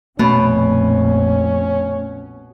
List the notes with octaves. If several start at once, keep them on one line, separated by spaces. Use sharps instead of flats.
A#1 F2 B2 A3 C#4